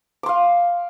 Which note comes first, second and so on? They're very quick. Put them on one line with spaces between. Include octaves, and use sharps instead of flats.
D6 C6 F5